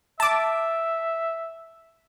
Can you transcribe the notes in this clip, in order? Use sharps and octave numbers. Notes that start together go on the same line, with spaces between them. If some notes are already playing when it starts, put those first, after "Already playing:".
E5 A5 D6